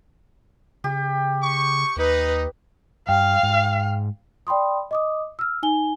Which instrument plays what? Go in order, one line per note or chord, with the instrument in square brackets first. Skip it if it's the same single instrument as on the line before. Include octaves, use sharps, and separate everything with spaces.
[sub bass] C#3 [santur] G4
[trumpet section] C#6
[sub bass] D#2 [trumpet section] D#4 [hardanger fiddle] B4
[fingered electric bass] G2 [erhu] F5 [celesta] G5
[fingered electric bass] G#2
[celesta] D5 G5 B5 C6 D#6
D#5 D6 D#6
E6 F6
D#4 G#5 G7